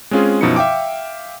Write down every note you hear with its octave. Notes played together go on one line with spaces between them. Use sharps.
G#3 C4 C#4 F4 G#4
F#2 B2 F3 D#4 E4 C#7
E5 F5 G5 D6